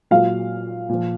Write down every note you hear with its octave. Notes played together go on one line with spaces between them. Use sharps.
A#2 F#3 F5
A#2 F3